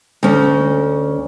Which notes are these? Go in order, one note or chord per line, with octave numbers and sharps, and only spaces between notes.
D2 C#4